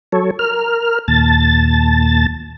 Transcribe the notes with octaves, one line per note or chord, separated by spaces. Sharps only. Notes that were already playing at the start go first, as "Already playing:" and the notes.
F#3 A4 C#5
A#4 F6
D#2 A#2 A5 A6